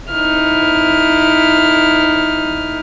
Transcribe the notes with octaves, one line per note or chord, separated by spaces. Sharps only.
D#4 E4 F6